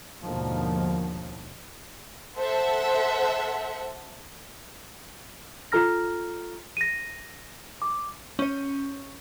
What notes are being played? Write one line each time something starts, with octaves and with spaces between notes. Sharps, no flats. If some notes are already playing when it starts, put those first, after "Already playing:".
D#2 G#2 B2 D3 D#3 F3
A4 C5 E5 F#5
F4 A4 A#5 F6 A#6
A#6 D#7
D6
C#4 C#5